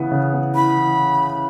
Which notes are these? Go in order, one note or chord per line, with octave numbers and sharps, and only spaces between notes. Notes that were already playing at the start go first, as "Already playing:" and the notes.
Already playing: C#3 E3 B3 E4
C#3
B3
E4 B5
E3